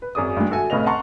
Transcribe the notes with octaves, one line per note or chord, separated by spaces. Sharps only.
B4
G#1 F#2 G#4 D5 D6 D#6
G2 G#3
F#4 A4 E5 G#5
F1 A2 C#3 B3 D#5 F7
F#5 A5 A#5 C6 C#6